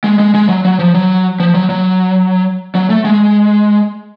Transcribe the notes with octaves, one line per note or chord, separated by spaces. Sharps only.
G#3
G#3
G#3
F#3
F#3
F3
F#3
F3
F#3
F#3
F#3
A3
G#3